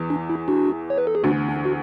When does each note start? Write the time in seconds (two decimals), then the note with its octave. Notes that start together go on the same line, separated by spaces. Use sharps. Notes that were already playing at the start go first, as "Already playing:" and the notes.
Already playing: E2 E3
0.10 D4
0.30 E4
0.48 D4 F#4
0.90 C#5
0.98 B4
1.07 A4
1.15 G#4
1.24 D2 D3 D4 F#4
1.49 D4
1.65 F#4